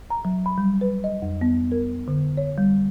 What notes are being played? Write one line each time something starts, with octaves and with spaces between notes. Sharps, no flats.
A#5
F#3
B5
G3
B4
D#5
F2
B3
A#4
D3
C#5
G3